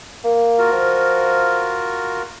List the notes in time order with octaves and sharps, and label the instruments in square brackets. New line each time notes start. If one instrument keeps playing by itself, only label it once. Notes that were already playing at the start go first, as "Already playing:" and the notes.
[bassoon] A#3
[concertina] F4 F#4 A#4
[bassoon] F3